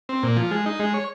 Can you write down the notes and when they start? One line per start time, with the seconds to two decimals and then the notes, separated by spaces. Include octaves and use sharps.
0.09 C4
0.23 A#2
0.37 F3
0.51 G#3
0.66 D#4
0.80 G#3
0.94 C#5